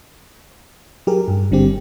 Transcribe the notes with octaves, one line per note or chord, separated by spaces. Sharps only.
F#3 G4 G#4 A#4
G2
G#1 D3 G3 C4 G4